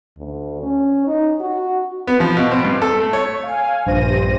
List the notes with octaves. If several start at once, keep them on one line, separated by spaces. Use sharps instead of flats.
D2
C#4
D#4
F#4
B3
F3
B2
C4
G2
A4
A3
C#5
F5 G#5
A#1 G2 C5 A#6 D#7